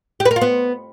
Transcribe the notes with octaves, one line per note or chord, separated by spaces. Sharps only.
G4
B4
A#4
F4
B3